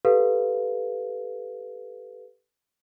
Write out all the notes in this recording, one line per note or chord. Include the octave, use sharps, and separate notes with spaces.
G4 A4 B4 F5